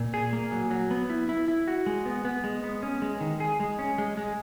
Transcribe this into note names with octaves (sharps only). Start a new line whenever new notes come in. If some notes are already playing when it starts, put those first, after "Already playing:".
Already playing: A#2
G#4
A#3
F#3
F#3
B3
E4
E4
E4
F#4
G#3
B3
B3
G#3
B3
C#4
G#3
D#3
G#4
G#3
C#4
G#3
G#3